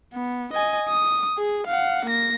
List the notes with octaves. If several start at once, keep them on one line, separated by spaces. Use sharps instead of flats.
B3
D#5 G#5
D#6
G#4
F5 F#5
A#3 A#6